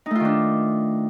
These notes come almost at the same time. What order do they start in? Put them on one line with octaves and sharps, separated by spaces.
D#4 A3 F4 D#3 D4